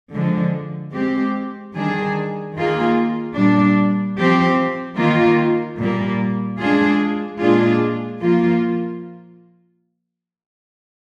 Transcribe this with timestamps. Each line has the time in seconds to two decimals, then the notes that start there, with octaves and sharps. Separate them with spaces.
0.14 D3 F3 G#3
0.94 G#3 C4 G4
1.75 D#3 G3 D4 G#4
2.55 D#3 A#3 F4 G#4
3.36 A#2 G3 D4
4.17 F3 C4 G4
4.97 D#3 A#3 F4
5.79 A#2 G3 A#3
6.60 G#3 D4 F4 G#4
7.40 A#2 G#3 D4 F4 G#4
8.20 F3 A#3 F4